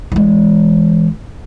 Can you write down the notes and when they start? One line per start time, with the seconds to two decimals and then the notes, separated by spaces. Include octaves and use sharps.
0.12 E3 G#3